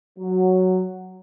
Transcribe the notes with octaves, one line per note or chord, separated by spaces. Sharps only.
F#3